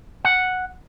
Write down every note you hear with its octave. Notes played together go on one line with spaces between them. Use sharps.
F#5